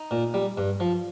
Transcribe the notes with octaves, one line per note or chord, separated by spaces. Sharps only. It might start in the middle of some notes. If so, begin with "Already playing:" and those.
Already playing: D#4
A#2
G3
G2
F3